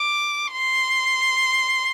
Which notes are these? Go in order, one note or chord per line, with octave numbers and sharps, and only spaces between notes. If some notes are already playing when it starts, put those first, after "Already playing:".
Already playing: D6
C6